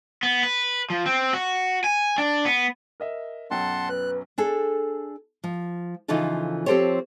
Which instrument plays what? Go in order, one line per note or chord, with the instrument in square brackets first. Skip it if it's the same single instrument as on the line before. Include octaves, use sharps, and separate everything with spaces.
[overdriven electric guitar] B3
B4
F3
C4
F#4
G#5
D4
B3
[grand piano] A#4 D#5 E5
[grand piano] B1 F#2 G5 [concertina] F#5 A5 C6
[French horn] B4 [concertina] F#6
[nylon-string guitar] D4 G#4 A4
F3
C#3 E3 F3 D#4 F4 A4
F3 C4 G4 A4 C5 C#5